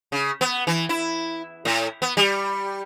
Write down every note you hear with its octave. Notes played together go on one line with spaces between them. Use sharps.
C#3
B3
E3
E4
A2
B3
G3